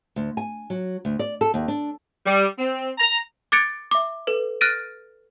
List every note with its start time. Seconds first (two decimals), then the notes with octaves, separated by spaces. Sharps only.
0.16 D2
0.37 G#5
0.70 F#3
1.05 D2
1.19 D5
1.41 A4
1.54 D#2
1.68 D4
2.26 G3
2.58 C4
2.98 A#5
3.52 D6 F#6 G#6 A6 C#7 D7
3.91 E5 D6
4.27 A4 B4
4.61 F6 F#6 A6 A#6 D7 D#7